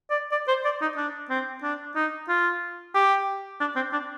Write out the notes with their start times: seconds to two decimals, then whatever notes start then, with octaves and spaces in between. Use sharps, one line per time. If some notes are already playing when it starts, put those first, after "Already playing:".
0.10 D5
0.32 D5
0.48 C5
0.65 D5
0.81 D#4
0.97 D4
1.30 C4
1.63 D4
1.95 D#4
2.29 F4
2.95 G4
3.60 D4
3.76 C4
3.92 D4